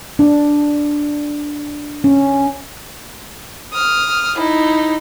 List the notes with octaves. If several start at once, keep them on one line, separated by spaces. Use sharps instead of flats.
D4
C#4
D#6 F6
D#4 E4